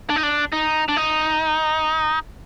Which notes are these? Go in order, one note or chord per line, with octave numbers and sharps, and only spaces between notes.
D4
D#4
D4
D#4
D4
D#4